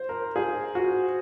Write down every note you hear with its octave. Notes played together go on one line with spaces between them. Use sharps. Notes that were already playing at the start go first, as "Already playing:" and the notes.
Already playing: C5
A#4
G#4
F#4